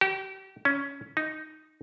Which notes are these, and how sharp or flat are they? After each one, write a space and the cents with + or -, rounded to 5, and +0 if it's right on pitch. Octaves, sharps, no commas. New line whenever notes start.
G4 -35
C#4 +10
D#4 +0